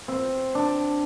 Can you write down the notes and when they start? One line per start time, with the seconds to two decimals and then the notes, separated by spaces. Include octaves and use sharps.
0.08 C4
0.55 D4